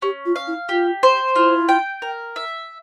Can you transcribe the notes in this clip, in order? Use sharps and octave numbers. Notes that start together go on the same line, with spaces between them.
C#4 G4
F4
F5
E4
F4 G4
C5
E4 F4
G5
A#4
E5